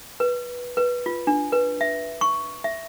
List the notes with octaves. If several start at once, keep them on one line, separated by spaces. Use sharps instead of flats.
B4
B4
F4
D4
B4
E5
C#6
E5